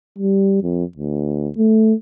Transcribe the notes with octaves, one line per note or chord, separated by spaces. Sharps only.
G3
F2
D2
A3